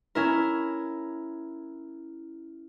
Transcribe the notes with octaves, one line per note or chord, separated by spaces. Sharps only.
C#4 E4 A#4